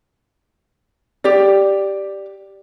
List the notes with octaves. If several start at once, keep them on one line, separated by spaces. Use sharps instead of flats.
G4 D5